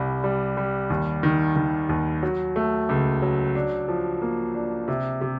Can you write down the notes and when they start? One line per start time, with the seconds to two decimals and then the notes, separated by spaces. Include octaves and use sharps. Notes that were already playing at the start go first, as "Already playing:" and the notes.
Already playing: C2 G3
0.24 G3
0.57 G3
0.90 D#2
1.23 D#3
1.56 D#3
1.89 D#2
2.23 F#3
2.56 A3
2.89 C#2
3.22 F#3
3.55 D4
3.88 F3
4.22 A#3
4.55 D4
4.88 C3
5.21 C3